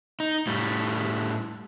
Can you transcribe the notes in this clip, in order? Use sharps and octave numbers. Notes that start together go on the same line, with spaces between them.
D#4
A2 G3